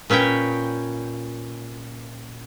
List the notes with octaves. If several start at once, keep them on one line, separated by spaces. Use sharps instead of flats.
A#2 C#4 B4 C#5 G5